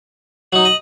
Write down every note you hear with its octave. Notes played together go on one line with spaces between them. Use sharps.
F#3 D#4 F#7
D#5